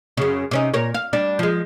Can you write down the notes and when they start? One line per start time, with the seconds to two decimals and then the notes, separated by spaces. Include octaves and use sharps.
0.17 F#2 C#3
0.51 C3 C#4 D#4
0.74 A#2 A#4 C#5
0.94 F5
1.13 G3 D4
1.39 F3 G#3